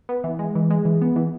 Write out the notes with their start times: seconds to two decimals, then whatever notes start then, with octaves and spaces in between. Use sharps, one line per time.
0.09 B3
0.24 E3
0.39 G#3
0.55 E3
0.70 G#3
0.85 E3
1.01 B3
1.16 E3